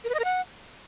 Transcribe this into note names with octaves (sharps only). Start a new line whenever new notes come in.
A#4
B4
D#5
A#4
F#5